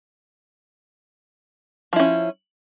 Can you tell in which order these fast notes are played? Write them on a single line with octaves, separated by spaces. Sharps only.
F3 E4 C#4